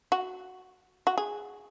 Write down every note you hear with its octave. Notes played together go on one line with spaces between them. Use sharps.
F#4
F#4
G#4